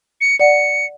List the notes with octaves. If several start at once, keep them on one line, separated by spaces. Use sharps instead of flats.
C#7
D5 F#5 C#7